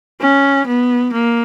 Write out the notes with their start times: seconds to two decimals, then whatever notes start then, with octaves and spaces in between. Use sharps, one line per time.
0.21 C#4
0.67 B3
1.13 A#3